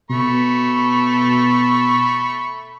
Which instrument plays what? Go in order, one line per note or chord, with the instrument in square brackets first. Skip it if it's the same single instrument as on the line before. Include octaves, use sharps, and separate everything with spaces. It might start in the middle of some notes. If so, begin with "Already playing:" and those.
[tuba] B2 [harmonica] A3 B5 C#6